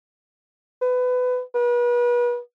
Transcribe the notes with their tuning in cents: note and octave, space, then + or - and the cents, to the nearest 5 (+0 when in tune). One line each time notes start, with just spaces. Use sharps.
B4 +20
B4 -35